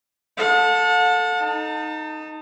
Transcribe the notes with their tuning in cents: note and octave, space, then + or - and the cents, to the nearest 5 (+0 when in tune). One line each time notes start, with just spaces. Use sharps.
A4 +0 F#5 -45
D#4 +0 A5 +35